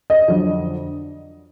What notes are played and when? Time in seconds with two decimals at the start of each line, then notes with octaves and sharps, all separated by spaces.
0.10 D#5
0.28 F2 D3 F#3 D4